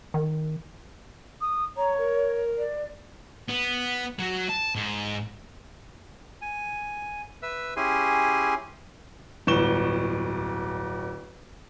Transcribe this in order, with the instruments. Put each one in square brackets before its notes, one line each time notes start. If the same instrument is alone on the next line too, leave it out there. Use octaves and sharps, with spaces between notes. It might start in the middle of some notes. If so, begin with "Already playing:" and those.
[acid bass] D#3
[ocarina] D#6
[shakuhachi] C#5 [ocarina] A#5
[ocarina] A#4
[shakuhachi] D5
[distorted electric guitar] B3
F#3 F#4
A5
G#2
[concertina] G#5
B4 E5 E6
C#4 E4 G4 G#4 G#5 C6
[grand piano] D1 G1 C#6 E7 G7